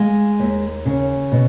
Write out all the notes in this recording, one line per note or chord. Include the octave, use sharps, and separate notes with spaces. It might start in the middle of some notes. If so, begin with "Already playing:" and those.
Already playing: G#3 F5
D#2
C#3
B2